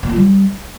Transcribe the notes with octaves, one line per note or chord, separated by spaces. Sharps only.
A#3
F4
G3